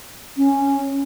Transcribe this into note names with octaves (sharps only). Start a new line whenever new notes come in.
C#4